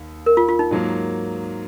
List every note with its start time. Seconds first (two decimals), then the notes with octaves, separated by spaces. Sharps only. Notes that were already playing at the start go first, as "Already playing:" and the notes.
Already playing: D#2
0.26 A#4
0.37 F4
0.48 F4
0.59 D#4
0.71 G#2 F#3 A#3